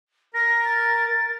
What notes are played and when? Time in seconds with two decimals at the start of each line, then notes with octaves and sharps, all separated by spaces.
0.34 A#4 A#6
0.64 A6